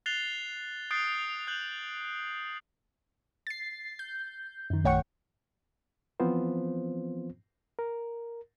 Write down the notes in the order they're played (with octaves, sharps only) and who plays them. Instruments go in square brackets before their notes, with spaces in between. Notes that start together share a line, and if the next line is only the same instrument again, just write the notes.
[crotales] F#6 A6 C7 F7 G7
D#6 F#6 G6 A6 C7 D7
F#6 G6 F#7
[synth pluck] A6 C7
G6
F#2 D#3
A#1 A3 C#5 F#5 G5 C#6
[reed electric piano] E3 F3 B3 C4 F4 C5
A#4